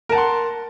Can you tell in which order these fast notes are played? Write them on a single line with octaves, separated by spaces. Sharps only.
A#4 A5 F#5 C6